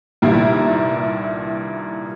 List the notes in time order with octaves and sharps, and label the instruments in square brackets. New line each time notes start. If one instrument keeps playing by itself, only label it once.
[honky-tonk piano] C2 G2 A#2 D#3 G3 E4